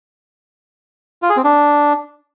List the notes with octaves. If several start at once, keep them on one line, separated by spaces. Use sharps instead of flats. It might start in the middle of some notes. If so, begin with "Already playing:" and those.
F4
G#4
C4
D4